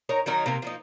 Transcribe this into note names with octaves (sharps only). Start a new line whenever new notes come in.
D#4 A#4 C#5 A#5
D#3 F#3 D#4 A#4
C3 A#3 A#4
F3 A#3 D#4